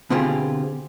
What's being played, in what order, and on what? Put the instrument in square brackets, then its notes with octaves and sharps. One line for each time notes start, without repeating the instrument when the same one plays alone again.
[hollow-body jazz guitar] B2 D3 C4 F4 G4 G#4